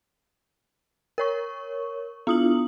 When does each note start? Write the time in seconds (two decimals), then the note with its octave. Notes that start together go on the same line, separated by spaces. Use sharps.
1.18 A#4 C#5 C#6
2.27 B3 D4 E4 F4 D#6 F#7